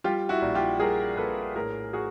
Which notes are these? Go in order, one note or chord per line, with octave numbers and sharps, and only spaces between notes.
G3 F4 G4
E4 F#4
A#1
F4 G4
G3 G#4 A#4
A#1 A4 B4
A2 G#4 A#4
F#4 G#4